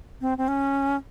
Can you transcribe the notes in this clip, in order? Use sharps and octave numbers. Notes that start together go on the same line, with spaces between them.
C4
C4
C#4